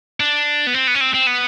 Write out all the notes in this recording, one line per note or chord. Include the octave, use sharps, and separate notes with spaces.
D4
B3
C4
B3
C#4
C4
C4
B3